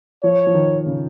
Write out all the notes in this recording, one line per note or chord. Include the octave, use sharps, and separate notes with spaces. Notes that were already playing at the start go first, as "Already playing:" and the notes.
F3 C#5
F3
D#3
C#3